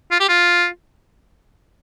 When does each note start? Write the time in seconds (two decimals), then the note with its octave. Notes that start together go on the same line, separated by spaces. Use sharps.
0.11 F4
0.20 G4
0.29 F4